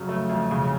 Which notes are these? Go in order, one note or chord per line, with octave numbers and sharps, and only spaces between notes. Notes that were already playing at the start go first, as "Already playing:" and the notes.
Already playing: F2 C#3 F#3
A3
F2
C#3